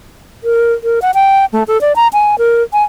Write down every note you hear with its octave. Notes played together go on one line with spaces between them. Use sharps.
A#4
A#4
F#5
G5
A3
A4
D5
A#5
G#5
A#4
G#5